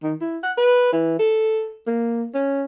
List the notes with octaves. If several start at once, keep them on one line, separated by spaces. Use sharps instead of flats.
D#3
E4
F#5
B4
E3
A4
A#3
C#4